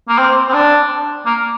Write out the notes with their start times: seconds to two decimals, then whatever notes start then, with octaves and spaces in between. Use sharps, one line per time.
0.08 A#3
0.18 C4
0.49 C4
0.53 D4
1.26 A#3